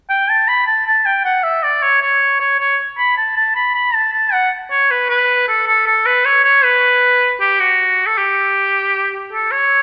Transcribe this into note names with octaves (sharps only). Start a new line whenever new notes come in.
G5
A5
B5
A5
A5
G5
F#5
E5
D5
C#5
C#5
C#5
C#5
B5
A5
A5
B5
B5
A5
A5
F#5
C#5
B4
B4
A4
A4
A4
B4
C#5
C#5
B4
G4
F#4
A4
G4
A4
C#5